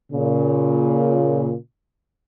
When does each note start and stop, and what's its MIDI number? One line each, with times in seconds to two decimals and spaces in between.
0.13 1.54 46
0.13 1.54 49